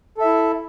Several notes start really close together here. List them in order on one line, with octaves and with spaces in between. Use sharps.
A4 E5 E4